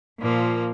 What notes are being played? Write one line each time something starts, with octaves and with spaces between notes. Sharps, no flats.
A#2 F3 A#3